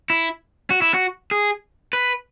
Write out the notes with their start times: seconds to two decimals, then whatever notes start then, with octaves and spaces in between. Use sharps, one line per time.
0.10 E4
0.70 F#4
0.82 E4
0.94 F#4
1.31 G#4
1.93 B4